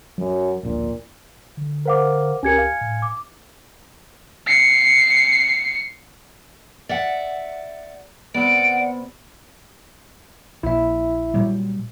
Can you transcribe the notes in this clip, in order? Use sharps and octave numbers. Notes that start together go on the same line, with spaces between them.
F#2 F#3
D1 A#1 A#2 D4
D3
A#4 C5 F5 F#5 D6
C#2 C#4 G4 A#4 G#5 G#6 C#7
F5
A2
D6
C7 C#7
D5 E5 F#5
C3 B3 D5 F#5 D7
A#1 E4 E5
A#2 F#3 G3